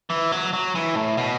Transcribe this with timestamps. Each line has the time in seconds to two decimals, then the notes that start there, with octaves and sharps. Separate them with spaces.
0.10 E3
0.32 F#3
0.53 F#3
0.75 E3
0.96 A2
1.17 B2